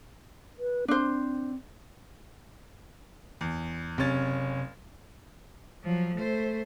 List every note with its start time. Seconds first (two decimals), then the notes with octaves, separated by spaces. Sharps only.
0.59 B4
0.88 C4 D4 C5
3.41 E2
3.98 F#1 C3 C#4 A6
5.83 F3 F#3
6.16 A3 C5